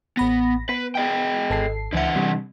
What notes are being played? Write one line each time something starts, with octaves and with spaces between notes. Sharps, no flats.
A1 B3 B5 A#6
B3 B4
G#4 D#5 G5
G#1 A4 C7
C#2 D3 E3 E5 F#5
C3 G3